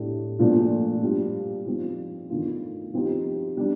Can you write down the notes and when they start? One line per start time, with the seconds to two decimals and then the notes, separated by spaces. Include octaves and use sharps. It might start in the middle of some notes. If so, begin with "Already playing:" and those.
Already playing: A2 A3 D4 G4
0.39 A#2 F3 A3 D4
1.03 G3 D4 F4
1.66 F3 C4 D#4
2.30 D#3 A3 D4 F4
2.93 F3 C4 D#4 G4
3.57 G3 D4